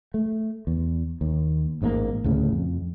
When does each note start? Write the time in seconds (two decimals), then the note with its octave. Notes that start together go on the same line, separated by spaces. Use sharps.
0.14 A3
0.67 E2
1.21 D#2
1.82 A1 G#2 B2 A#3
2.24 D2 A2 C#3
2.53 F2